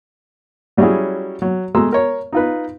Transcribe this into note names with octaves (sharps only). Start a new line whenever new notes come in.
F#3 G3 C#4 E4 F#4 G#4
F#3
G#3 A3 A#5 C6 E6
A#4 C#5
D#4 F4 B4